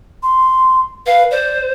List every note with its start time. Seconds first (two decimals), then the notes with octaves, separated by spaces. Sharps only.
0.23 C6
1.06 B4 F5
1.31 C5 D5